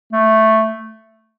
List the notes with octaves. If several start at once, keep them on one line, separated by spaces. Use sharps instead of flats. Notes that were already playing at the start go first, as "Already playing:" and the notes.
A3